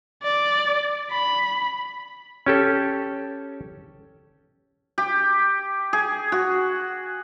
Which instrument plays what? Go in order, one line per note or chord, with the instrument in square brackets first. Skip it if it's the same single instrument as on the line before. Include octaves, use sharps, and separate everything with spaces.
[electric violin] D5
B5
[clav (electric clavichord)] C#4 G4 A4
[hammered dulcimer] G4
G#4
F#4